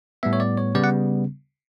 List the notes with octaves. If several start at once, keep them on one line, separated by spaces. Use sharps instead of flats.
A2 G3 B3 E5
C#5
D5
C#5
C#3 G3 B3 D5
F#5